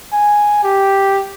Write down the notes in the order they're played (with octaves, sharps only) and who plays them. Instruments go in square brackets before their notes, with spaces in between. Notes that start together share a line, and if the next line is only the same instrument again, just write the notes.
[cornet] G#5
G4